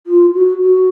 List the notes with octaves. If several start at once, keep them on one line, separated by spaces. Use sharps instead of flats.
F4
F#4
F#4